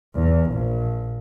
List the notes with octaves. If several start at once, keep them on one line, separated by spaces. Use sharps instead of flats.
E2
A#1